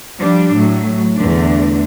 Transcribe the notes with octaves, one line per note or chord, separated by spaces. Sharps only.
F3 G3 D4
A2 F#3
E2 D3 A3 D4